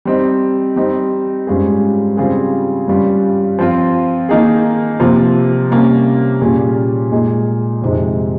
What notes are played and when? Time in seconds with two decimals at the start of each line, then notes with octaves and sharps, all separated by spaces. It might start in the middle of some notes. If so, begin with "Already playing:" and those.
0.05 G3 C4 D#4
0.76 G3 C4 D#4
1.47 G#2 G3 C#4 F4 G#4
2.17 C#3 G3 C4 F4 G#4
2.88 G2 G3 C#4 F4
3.59 F3 C4 F4
4.29 D#3 A#3 D#4 G#4
5.00 C3 F3 A#3
5.71 C3 G3 A#3 C#4
6.42 A#2 G3 C#4 G#4
7.11 A#2 G#3 D#4 G#4
7.82 F2 C3 D#3 G#3